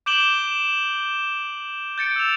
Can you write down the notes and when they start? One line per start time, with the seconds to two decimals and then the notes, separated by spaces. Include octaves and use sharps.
0.06 D6 G6 D7 E7 F#7 G7
1.98 G6 A6 C#7 D7
2.16 E6 E7 F7